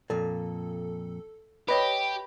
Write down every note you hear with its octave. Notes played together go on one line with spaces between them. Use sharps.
F2 A#2 A4
G4 B4 C#5 D#5 B5